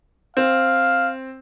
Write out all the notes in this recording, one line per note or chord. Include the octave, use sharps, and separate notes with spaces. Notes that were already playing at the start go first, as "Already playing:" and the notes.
C4 F5